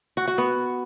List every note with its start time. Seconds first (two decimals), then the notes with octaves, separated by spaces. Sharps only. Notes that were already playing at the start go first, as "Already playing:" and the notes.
0.17 F#4
0.28 F#4
0.38 B3